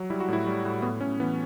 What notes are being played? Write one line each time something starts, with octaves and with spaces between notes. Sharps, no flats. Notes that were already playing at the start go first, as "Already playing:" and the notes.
Already playing: F#3
G3 E4
F#4
A2 E4
G3
A2
A2 B3
A2 C#4
E3 B3